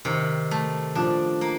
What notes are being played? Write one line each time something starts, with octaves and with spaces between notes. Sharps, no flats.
C3 D#3
A3
F3 D4
A#3